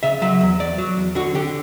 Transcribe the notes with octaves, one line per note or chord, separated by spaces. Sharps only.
C#3 E5
F#3 E5
E2
E2 D5
F#3
E2
D3 F#4
D3 G4